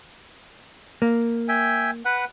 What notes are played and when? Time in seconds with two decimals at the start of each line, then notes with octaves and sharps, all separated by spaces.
1.02 A#3
1.48 E5 G5 G#5
2.05 B4 F#5